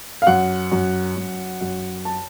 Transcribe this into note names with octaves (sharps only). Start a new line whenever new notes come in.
F5
F#2 F#5
F#2
F#2
F#2
A5